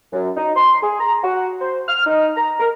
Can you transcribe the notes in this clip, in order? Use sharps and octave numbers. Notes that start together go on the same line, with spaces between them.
F#2
D#4
C6
G#4
A#5
F#4
C5
F6
D#4
A#5
A#4